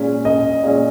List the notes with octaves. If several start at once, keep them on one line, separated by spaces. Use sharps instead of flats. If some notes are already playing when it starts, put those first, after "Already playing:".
Already playing: A#2 G#3 C#4
D#5
A#2 G#3 C#4